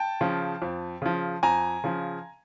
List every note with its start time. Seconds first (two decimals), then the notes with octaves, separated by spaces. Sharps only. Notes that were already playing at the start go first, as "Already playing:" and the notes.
Already playing: G5 A5
0.21 C#3 F3
0.62 F2
1.02 C#3 F3
1.43 F2 G#5 A#5
1.84 C#3 F3